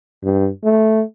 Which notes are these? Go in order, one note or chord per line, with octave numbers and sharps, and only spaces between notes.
G2
A3